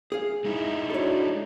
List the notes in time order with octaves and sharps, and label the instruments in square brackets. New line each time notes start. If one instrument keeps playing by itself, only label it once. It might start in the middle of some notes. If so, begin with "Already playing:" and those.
[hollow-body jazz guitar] G#4 F5
[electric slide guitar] G#3 D#4 E4
[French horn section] D4 F#4 [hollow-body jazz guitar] A4 C#5